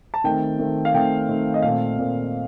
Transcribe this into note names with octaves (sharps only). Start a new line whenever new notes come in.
A5
D#3 A3 C4 G5
D#3 A3 C4
F5
D#3 A3 C4 G5
D#3 A3 C4
D#5
A#2 A3 C4 F5
A#2 A3 C4